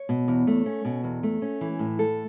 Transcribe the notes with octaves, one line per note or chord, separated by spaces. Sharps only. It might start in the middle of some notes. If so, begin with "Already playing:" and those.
Already playing: C#5
B2
E2
A3
C#4
B2
E2
A3
C#4
E3
A2
A3 A4